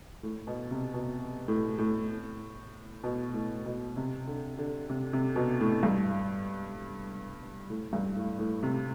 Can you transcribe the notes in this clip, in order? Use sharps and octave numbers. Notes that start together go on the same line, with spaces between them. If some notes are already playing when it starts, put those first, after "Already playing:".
A2
B2
C3
B2
A2
A2
B2
A2
B2
C3
D3
D3
C3
C3
B2
A2
G2
A2
G2
A2
A2
C3